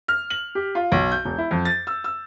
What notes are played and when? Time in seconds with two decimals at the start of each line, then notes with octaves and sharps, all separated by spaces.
0.08 F6
0.30 F#7
0.55 G4
0.75 F4
0.92 B1
1.12 G6
1.25 E1
1.38 E4
1.51 F2
1.65 A6
1.87 E6
2.04 E6